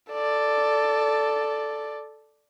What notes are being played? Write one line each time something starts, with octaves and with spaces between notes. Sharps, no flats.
A4 D5